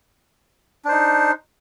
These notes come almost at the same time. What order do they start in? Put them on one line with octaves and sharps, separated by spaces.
D4 C5 D#4